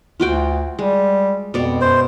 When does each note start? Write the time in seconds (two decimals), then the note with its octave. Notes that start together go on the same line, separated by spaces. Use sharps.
0.20 D2 F4 F#4 G5
0.79 G3 G#3
1.54 F2 B2 D5
1.81 F#2 C5